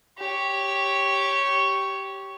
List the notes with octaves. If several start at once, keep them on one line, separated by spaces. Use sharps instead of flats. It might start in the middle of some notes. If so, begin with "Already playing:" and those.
G4 C#5